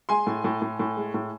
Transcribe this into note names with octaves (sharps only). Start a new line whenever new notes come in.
G#3 G#5 C6
A2
A2
A2
A2
G#3
A2